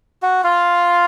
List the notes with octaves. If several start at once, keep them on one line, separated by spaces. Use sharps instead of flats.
F#4 F#5
F4 F5